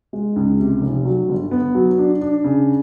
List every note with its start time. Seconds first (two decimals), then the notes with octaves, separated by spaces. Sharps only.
0.13 G#3
0.36 C#2
0.60 C3
0.82 F1
1.05 F#3
1.29 G1
1.51 B3
1.75 F#3
1.98 D4
2.21 D4
2.44 C#3